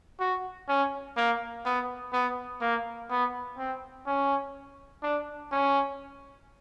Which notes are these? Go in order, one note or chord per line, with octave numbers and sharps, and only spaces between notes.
F#4
C#4
A#3
B3
B3
A#3
B3
C4
C#4
D4
C#4